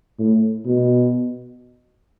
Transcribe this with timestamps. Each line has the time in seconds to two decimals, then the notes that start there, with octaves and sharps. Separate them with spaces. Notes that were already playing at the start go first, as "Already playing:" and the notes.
0.19 A2
0.65 B2